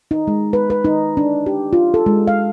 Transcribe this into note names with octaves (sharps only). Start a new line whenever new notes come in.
D#4
G#3
B4
B4
D#4
D4
G4
F4
A4
G#3
F5